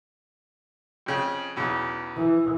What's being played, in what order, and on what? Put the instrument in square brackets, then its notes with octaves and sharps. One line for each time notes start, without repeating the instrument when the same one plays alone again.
[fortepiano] F2 C#3 G5
B1 E2 C#3
[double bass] E3